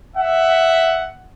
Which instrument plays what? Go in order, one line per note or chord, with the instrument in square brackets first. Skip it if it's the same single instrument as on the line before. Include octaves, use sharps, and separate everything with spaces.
[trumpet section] E5 F#5